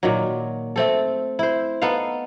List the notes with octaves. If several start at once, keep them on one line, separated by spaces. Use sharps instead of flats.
A#2 D#3 F#3
A3 C4 A4
E4 C5
B3 D#4 A4 F5